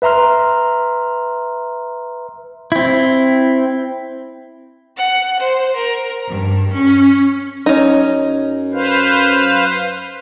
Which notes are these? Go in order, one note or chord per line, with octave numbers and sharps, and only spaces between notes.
B4 E5 A#5 C6 F6
C4 E4
F#5
C5
A#4
G2
C#4
F#2 C#4 D#4
B4 C5 F5